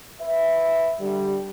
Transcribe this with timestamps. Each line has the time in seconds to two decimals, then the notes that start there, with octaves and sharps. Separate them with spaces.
0.21 B4 E5
1.00 D3 G3